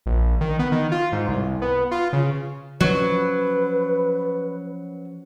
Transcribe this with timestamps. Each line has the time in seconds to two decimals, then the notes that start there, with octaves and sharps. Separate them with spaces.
0.06 A#1
0.41 D#3
0.59 B3
0.72 D#3
0.92 F4
1.12 G#2
1.28 C2
1.62 B3
1.91 F4
2.13 C#3
2.80 F3 F#3 C#4 B4